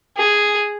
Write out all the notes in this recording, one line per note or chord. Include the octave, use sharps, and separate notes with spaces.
G#4